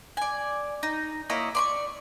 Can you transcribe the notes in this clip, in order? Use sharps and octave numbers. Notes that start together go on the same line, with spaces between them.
D5 G#5
D#4
A#3 E4 C#5 D#5
D5 C6 C#6